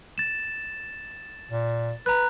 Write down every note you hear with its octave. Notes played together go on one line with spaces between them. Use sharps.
A6 E7
A#2
B4 A#5 F#6